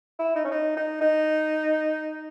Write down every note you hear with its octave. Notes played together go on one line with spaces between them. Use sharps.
E4
D#4
C#4
D#4
D#4
D#4